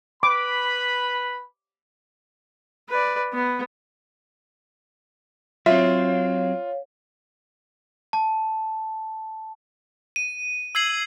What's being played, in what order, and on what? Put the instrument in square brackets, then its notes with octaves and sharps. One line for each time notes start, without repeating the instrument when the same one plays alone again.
[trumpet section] B4 B5 [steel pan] D6
[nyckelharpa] B4 D5
B3
[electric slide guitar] F#3 C4 [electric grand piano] F4 [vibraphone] C#5 F5 [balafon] E5
[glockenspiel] A5
[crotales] D#7
E6 G#6 C7 F#7